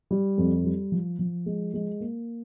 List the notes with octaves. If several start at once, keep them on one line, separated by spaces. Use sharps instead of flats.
G3
F2
G3
F3
F3
G#3
G#3
A#3